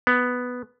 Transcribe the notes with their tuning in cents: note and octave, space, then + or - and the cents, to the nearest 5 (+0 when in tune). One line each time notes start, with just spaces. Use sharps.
B3 +0